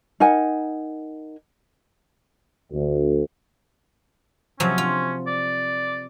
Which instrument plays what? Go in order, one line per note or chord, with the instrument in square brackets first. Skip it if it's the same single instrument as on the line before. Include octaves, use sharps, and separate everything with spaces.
[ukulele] D#4 A#4 F#5 G#5
[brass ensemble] D2
[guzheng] C3 F3 F#3 [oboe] C#4
[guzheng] F4
[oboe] D5